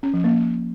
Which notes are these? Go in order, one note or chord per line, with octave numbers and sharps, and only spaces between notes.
C#4
F3
A#3